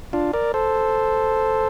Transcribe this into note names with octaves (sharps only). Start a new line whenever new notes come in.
D4 F4
A#4 D5
A4 C5